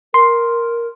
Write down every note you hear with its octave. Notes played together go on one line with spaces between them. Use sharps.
A#4 C6